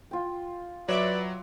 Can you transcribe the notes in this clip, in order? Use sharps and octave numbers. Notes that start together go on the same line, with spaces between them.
F4 G5
F#3 B4 C#5 D5 E5 D6